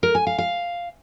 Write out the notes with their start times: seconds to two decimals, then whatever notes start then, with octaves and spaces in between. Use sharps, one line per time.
0.03 A#4
0.15 G#5
0.27 F5
0.38 F5